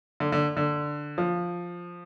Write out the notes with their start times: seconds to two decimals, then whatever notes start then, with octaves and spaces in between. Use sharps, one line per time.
0.20 D3
0.32 D3
0.57 D3
1.18 F3